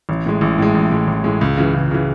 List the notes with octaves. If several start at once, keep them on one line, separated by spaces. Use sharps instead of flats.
A1
A2 G#3
A1
A2 G#3
A1
A2 G#3
A1
A2 G#3
C#2
C#3 E3
C#2
C#3 E3